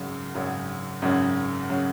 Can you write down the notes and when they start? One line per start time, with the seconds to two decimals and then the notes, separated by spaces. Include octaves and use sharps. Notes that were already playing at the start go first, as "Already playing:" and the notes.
Already playing: G#1 F#2 C#3 F#3
0.34 G#1 F#2 C#3 F#3
1.02 G#1 F#2 C#3 F#3
1.70 C#3 F#3